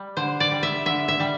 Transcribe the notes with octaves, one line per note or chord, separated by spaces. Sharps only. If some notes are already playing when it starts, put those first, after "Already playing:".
Already playing: G3
D3 C5
D5
G3
E5
D3 E5
E5
G3